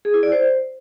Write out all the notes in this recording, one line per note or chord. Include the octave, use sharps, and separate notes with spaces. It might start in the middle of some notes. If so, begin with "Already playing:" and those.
G#4
E4
D5
C5